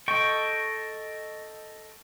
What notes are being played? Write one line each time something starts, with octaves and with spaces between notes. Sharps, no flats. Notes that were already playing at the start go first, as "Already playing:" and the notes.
A4 D#5 G5 C#6